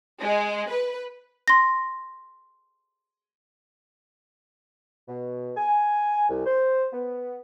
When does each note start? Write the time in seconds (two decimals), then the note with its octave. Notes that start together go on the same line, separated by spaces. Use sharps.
0.22 G#3
0.72 B4
1.48 C6 A#6
5.08 B2
5.57 G#5
6.29 C2
6.46 C5
6.93 B3